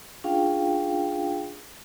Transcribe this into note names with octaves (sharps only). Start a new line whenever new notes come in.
C#4 D4 F4 G#4 F5 G5